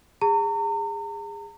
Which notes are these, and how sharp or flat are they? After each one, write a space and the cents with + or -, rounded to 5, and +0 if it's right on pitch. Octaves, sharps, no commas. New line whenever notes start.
G#4 -25 A#5 -40